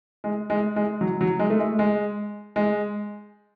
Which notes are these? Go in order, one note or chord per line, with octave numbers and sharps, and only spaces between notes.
G#3
G#3
G#3
F#3
F#3
G#3
A3
G#3
G#3
G#3